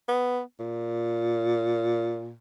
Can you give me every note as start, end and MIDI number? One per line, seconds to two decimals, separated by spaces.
0.08 0.41 59
0.59 2.38 46